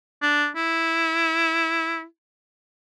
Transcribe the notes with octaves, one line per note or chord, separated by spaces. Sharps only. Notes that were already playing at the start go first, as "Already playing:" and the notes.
D4
E4